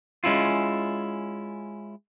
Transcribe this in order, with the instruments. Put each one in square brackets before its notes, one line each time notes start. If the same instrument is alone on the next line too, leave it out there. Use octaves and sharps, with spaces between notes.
[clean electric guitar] G#3 C#4 E4 F4